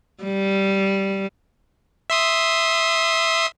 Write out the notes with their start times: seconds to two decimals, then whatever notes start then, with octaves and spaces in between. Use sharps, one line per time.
0.23 G3
2.10 E5 C6 D#6